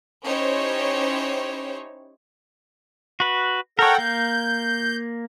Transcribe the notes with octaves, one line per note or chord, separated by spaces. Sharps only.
C#4 D#4 E4 G4 C5 C#5
F#4 B4
A4 A#4 C#5 F#5 G5
A#3 G6